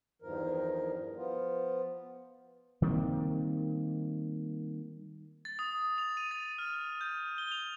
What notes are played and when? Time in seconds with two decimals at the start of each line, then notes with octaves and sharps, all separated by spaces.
0.22 E2 G2 D#3 F3 A#4
1.17 F3 B3 F4
2.82 D#3 G3 A#3 C4
5.45 A6
5.59 D#6
5.98 F7
6.17 D#7
6.31 A6
6.58 F6
7.01 G6
7.38 G7
7.52 F7